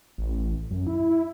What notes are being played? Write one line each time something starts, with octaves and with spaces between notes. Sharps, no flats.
A1
F#2
E4